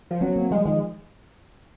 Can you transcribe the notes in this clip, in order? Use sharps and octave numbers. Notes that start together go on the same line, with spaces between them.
F3
F#3 B3 C#4
A#3 C4
F3 G3 G#3
D#3 F3 G#3